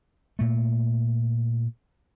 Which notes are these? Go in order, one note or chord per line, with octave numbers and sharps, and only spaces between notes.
A#2 A3